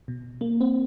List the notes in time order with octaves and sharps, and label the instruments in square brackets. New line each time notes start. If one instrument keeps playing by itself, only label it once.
[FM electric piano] B2
A#3
C4